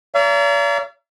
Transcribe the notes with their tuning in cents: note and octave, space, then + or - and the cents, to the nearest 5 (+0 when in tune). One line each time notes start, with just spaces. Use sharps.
D5 -45 F5 -45 A#5 +0